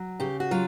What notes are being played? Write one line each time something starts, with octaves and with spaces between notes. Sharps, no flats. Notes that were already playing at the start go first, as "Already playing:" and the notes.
Already playing: F#3
C#3 G4
F#4
F#3 F4